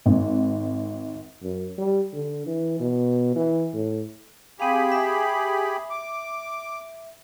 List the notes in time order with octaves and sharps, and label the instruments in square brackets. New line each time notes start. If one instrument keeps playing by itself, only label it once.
[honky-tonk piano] G#1
[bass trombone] F#2
G3
D3
E3
B2
E3
A2
[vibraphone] C4 F5 [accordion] G4 G#4 B5
[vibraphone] E5
[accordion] D6